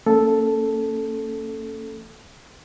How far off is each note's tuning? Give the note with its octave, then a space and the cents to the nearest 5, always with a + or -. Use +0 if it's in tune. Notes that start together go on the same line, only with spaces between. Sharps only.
A#3 -30 C#4 +0 A4 -5